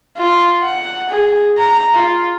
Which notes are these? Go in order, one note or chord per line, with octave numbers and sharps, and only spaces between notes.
F4
F#5
G#4
A#5
F4